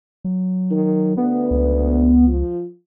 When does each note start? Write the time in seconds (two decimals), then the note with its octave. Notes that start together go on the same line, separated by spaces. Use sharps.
0.24 F#3
0.71 D#3
1.17 D2 B3
1.51 C#2
2.27 F3